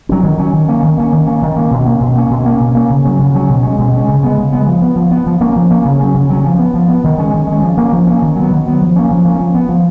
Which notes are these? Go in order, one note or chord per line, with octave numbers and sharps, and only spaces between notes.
F#3 C#4
D#3
F#3 C#4
D#3
A#3 C#4
D#3
A#3 C#4
D#3
A#3 C#4
D#3
A#3 C#4
B2
A#3 C#4
B2
A#3 C#4
B2
A#3 C#4
B2
A#3 C#4
C#3
F#3 C#4
C#3
F#3 C#4
B2
G#3 C#4
B2
G#3 C#4
C#3
G#3 B3
C#3
G#3 B3
F3
B3
F3
B3
F3
A#3 C#4
F3
A#3 C#4
C#3
F#3 C#4
C#3
F#3 C#4
F3
B3
F3
B3
D#3
G#3 C#4
D#3
G#3 C#4
F3
A#3 C#4
F3
A#3 C#4
D#3
F#3
B3
D#3
F#3 B3
F3
A#3 C#4
F3
A#3 C#4
F3
B3
F3